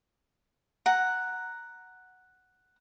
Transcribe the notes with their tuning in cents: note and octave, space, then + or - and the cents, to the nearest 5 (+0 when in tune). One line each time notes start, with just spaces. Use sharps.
F#5 +0 A#5 +0